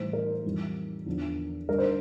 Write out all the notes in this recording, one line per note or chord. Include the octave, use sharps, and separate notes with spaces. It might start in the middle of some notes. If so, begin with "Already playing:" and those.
Already playing: A2 E3 G3 C5
A#4
F2 E3 G3
E2 D3 F3
G2 D3 G3 A#4
C5